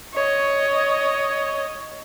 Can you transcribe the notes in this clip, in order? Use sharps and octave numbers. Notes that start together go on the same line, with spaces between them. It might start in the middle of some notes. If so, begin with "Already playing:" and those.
C#5 D#5